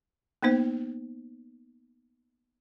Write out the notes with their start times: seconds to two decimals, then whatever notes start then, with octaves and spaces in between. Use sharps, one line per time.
0.43 A#3 B3 D#4 C5